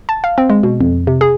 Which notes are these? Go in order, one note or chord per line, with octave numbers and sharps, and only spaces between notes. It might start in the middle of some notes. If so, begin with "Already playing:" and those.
A5
F5
C4
G#3
B2
F2
C3
G#4